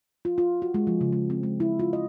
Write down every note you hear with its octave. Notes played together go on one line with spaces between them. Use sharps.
F4
F4
F#4
G#3
F3
C#3
G#3
C4
G#3
E4
F4
D#5